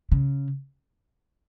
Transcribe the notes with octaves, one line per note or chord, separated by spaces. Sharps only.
C#3